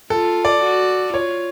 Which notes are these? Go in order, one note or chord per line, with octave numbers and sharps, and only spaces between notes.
F4 A4
D5
F#4
F4 C#5